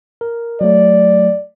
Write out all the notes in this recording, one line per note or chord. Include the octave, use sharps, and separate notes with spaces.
A#4
F#3 A3 D5